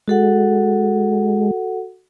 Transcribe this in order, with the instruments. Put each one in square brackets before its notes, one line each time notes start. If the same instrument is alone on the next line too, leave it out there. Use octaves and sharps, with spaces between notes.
[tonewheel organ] G#3 [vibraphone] F#4 A4 F#5